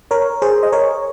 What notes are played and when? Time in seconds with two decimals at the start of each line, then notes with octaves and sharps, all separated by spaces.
0.11 A#4 C#5
0.42 G#4 C5
0.63 D#5
0.72 A#4 C#5